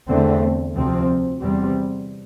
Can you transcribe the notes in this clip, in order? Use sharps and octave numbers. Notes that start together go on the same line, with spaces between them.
E2 D3 A3 C4
D2 C3 F3 C4
E2 C3 G3 C4